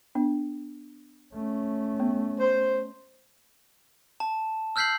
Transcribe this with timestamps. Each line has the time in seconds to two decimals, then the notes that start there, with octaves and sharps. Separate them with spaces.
0.15 B3 D4
1.35 A3 C#4
2.00 B3
2.40 C5
4.20 A5
4.76 E6 F6 G6 B6 C7 F#7